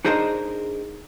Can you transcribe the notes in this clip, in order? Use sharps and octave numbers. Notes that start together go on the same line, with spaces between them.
D4 D#4 G#4 A#4 C5 D#5